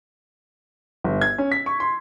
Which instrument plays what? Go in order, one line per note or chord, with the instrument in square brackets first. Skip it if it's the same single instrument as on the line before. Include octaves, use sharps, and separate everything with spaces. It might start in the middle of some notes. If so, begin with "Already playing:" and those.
[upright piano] G1
G#6
C#4
B6
C#6
C6